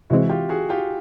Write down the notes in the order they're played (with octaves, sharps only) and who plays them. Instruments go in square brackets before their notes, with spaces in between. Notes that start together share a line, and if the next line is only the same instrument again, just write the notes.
[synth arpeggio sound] C3 E3 G#3 C4 [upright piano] E4 F#4
[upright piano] F4 G4
F#4 G#4
F4 G4